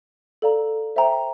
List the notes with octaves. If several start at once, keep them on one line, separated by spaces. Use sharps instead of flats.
A4 D5 F5 A#5
C5 E5 G5 A#5